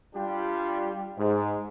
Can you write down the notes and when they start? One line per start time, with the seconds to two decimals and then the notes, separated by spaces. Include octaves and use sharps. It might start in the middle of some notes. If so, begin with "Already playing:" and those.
0.15 G3 D4 F4 G4
1.18 G#2